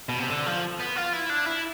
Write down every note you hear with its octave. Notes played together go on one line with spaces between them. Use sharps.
B2
C3
D3
F3
B3
F4
E4
D4
E4